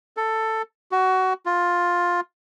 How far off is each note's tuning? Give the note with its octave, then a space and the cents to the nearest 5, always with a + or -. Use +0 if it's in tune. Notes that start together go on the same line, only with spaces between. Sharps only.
A4 +10
F#4 +20
F4 +10